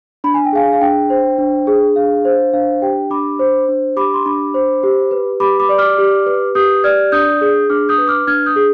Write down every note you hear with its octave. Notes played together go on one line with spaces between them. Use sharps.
D4 B5
G#5
G5
G#4 F5 G#5
F5
D4 G5
C5
D4
G#4
D4 F5
C5
D4 F5
G4 G5
D4 B5 D6
C5
D4
G4 B5 D6
C6
D4 B5 D6
C5
G4
B4
G4 B5 D6
B5 D6
D5
D6 F6
G4
B4
G4 D#6 G6
D5 F6 G#6
D4 D#6 G6
G#4
D4 D6 F6
D#6 G6
B4
D6 F6
D4 F6 G#6
D#6 G6
G#4